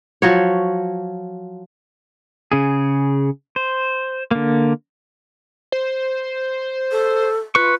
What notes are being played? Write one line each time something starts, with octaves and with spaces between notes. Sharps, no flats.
F3 F#3 C#5
C#3 G#4
C5
D3 A#3
C5
A4
F4 B4 C#6